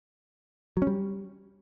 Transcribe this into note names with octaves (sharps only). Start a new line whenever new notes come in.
F#3
C#4
G3